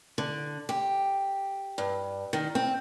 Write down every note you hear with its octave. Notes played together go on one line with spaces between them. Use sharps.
D3
G4
G2
D#3
C4